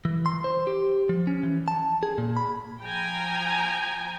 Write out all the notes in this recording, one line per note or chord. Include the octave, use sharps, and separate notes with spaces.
E3
C6
C5
G4
F3
C#4
E3
A5
G#4
A#2
B5
F3 G5 G#5 A#5